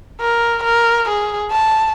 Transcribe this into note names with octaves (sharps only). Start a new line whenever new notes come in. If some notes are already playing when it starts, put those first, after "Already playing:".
A#4
A#4
G#4
A5